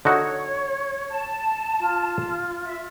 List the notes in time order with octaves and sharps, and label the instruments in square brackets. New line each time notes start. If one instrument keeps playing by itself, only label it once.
[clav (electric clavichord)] D3 D#4 F#4 [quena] C#5
[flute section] A5
[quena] F4
[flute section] E5